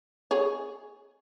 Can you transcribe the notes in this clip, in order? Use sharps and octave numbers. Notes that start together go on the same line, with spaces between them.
G#4 C#5